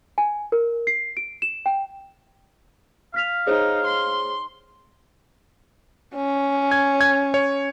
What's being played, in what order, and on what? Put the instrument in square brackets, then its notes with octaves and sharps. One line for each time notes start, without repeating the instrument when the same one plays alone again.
[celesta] G#5
A#4
C7
D7
E7
G5
[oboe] F5 [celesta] F6 B6 F7
[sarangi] D#4 [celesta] G#4 C5 C#5
[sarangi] C6
C#4
[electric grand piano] G#6
G#6
C#5